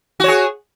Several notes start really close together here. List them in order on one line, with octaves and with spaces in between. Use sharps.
F#4 C#5 G#4